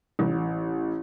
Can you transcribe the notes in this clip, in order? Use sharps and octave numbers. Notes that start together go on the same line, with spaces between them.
A1